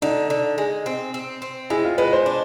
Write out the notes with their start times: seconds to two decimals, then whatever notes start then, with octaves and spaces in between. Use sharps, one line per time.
0.02 D3 D#4
0.30 D3
0.58 G#3
0.86 C4
1.14 C4
1.42 C4
1.70 G#3 E4
1.84 F4
1.98 G#3 B4
2.13 C5
2.26 D4